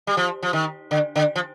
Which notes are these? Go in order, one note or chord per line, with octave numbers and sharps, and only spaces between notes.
G3
F3
F3
D#3
D3
D3
F3